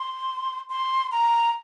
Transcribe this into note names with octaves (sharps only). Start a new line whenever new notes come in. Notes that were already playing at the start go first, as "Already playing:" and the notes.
Already playing: C6
C6
A#5